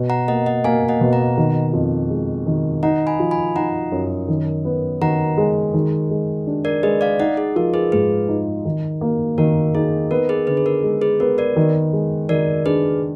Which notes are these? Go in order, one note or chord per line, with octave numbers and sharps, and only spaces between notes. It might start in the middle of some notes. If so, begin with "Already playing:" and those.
Already playing: B2
F#5 A#5
A#3 D#5 F#5
D#5 F#5
A#3 F5 G#5
D#5 F#5
B2
F#5 A#5
D#3
F2
G#3
D#3
D#4 F#5 A#5
G#5 B5
F3
G#5 B5
D#4 F#5 A#5
F#2
D#3
B3
D#3 F#5 A#5
G#3
D#3
G#3
D4
A#4 D5
G#3 B4 D#5
D5 F5
D#4 D#5 F#5
G#4
F3 A#4
G#4 B4
G#2 G#4 B4
D#4
D#3
A#3
D#3 A#4
D#4 G#4
B3 A#4
G#4 B4
D3 G#4 B4
G#4
A#4
G#3
G#4 B4
B3 A#4
A#4 D5
D#3
G#3
D#3 A#4 D5
D4 G#4 B4